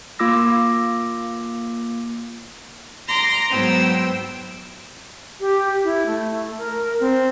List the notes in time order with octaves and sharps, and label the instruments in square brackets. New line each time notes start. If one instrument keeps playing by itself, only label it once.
[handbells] A#3 F4 D6 E6 A#6
[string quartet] A#5 C6 D6 A#6
G#2 F#3 B3 C5 G5 E6
[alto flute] G4
E4
A3
A#4
C4